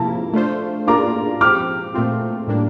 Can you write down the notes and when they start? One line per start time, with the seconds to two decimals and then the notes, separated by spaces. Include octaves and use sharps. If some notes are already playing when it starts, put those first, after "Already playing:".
Already playing: C3 F3 A#3 E4 A#4 A5
0.33 A3 D4 F4 C5
0.87 A#3 D4 F4 A#4 D5 A#5 D6
1.41 F3 C4 G4 D6 F6
1.94 A#2 A3 C4 F4
2.48 A2 G3 A#3 D4